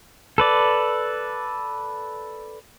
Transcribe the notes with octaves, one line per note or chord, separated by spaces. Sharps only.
A4 B4 D5